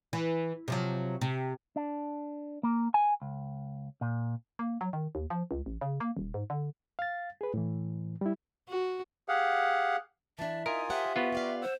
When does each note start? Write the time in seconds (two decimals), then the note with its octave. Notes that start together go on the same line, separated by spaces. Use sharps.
0.13 E3
0.68 C3 F3 F#3
1.21 C3
1.76 D4
2.63 A#3
2.94 G#5
3.22 C#2
4.01 A#2
4.59 A#3
4.81 F#3
4.93 D#3
5.15 D#2
5.30 F3
5.51 C#2
5.66 A1
5.81 C#3
6.00 A#3
6.17 D#1
6.34 G#2
6.50 D3
6.99 F5 A6
7.41 G#4 B4
7.54 A2 E3
8.21 G3 E4
8.69 F#4
9.28 G4 G#4 F5 F#5
10.39 E3 D4 E5 A5
10.66 D#4 F4 A#4 G#5 D#6
10.90 G4 C5 E5 F#5
11.16 B3 F4 F#4 B4
11.32 G4 D5 F5
11.62 C5 F#5 E6